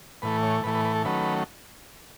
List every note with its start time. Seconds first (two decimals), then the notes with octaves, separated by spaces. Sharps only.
0.22 A2 E3 A3 B4
0.43 C#5
0.64 A2 E3 A3 B4
0.74 B4
0.85 B4
0.95 A4
1.05 D#3 F#3 A3 C#4 B4